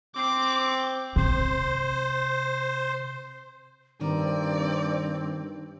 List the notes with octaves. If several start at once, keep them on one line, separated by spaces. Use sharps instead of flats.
C4 D6
C3 C5
G2 D#3 C4 D5